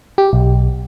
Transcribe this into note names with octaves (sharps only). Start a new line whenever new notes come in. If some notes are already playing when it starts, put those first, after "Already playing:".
G4
B1